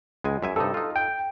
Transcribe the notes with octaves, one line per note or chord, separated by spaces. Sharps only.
C#2 G#3 G#5
F#2 E5 G#5
G2 C3 D#4 A4
D#4 F4
G5